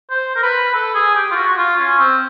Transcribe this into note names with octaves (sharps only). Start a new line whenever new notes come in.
C5
A#4
B4
A4
G#4
G4
F4
F#4
F#4
F4
C#4
C4